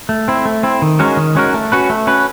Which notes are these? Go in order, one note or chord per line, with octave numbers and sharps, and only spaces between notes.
A3
C4 E4
A3
C4 E4
D#3
G#3 C#4 F#4 A#4
D#3
G#3 C#4 F#4 A#4
A3
C#4 F#4 B4
A3
C#4 F#4 B4